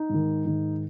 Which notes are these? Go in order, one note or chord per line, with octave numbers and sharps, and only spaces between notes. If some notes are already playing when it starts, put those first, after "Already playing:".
Already playing: D#4
G#2 D#3
G#2 D#3